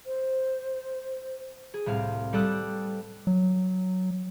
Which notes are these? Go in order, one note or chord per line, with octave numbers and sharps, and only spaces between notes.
C5
G#4
C2 A2 C4 F5
G3 G4 A4 B4 D#6 F#6
F#3